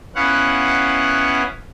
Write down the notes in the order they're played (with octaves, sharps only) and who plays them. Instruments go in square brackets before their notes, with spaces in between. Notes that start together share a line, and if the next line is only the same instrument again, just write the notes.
[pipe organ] B3 C#4 E4 F5 F#5